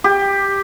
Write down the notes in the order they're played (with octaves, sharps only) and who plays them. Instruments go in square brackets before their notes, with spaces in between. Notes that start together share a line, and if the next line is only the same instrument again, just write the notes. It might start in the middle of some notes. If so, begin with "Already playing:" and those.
[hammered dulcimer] G4